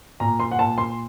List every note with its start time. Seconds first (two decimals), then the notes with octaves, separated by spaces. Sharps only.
0.20 A#2 A#5
0.40 C6
0.51 F#5
0.59 A#2 A5
0.78 C6